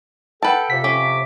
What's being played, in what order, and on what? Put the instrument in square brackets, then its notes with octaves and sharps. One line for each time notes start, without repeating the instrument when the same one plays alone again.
[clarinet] A4 [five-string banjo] B4 A5 [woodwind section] F#5 G5
[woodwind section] F2 C3 [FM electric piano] B6
[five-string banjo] C#4 [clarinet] D6